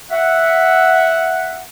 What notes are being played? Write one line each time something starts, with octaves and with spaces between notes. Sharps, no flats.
E5 F#5